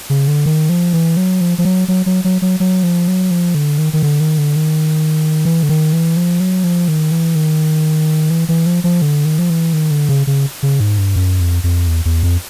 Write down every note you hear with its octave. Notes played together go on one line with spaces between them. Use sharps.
C#3
D3
D#3
F3
E3
F#3
F3
F3
F#3
F#3
F#3
F#3
F#3
F#3
F3
F#3
F3
D3
D#3
D#3
D3
D#3
D3
D#3
E3
D3
D#3
E3
F3
F#3
F3
D#3
E3
D#3
E3
E3
F3
F3
D3
D#3
F3
E3
D#3
D3
C#3
C#3
C#3
G#2
G2
F#2
F2
F2
E2
E2
F2